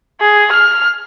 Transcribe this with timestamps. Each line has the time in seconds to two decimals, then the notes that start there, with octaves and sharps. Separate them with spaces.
0.20 G#4
0.52 F6